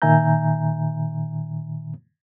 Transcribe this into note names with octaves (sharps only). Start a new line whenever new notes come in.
A#2 D#3 E5 G#5 A#5 G6